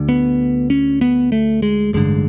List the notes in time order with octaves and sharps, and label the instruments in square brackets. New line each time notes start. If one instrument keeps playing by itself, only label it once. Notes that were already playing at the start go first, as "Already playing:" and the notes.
Already playing: [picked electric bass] D2 D3
B3
C#4
B3
A3
G#3
A1 G2 D3 G#3